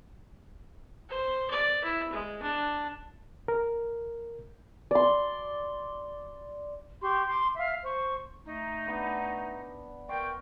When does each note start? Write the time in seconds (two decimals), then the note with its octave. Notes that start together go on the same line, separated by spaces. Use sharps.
1.09 C5
1.50 D5
1.84 E4
2.12 G#3
2.42 D4
3.48 A#4
4.91 D5 C6
7.02 G4 C6 C#6
7.27 C6 D6
7.57 E5 F5
7.84 C5 C#6
8.46 A3 D#4
8.86 B3 D4
10.09 A#4 D5 G5 C6 C#6